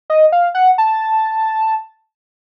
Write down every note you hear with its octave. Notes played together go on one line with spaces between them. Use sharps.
D#5
F5
F#5
A5